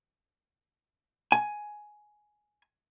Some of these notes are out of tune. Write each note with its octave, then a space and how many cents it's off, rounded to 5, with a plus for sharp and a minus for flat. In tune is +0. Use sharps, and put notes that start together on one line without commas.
G#5 +10